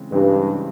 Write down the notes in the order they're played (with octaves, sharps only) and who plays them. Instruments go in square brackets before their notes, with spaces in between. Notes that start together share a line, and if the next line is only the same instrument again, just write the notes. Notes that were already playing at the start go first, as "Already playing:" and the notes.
Already playing: [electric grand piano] C#3 E3 G#3 C4
[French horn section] G2 [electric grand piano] C#3 E3 G#3 C4